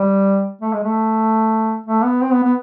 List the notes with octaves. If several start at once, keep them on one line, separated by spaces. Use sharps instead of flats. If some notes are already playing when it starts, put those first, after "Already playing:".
Already playing: G3
A3
G#3
A3
A3
B3
C4
B3
B3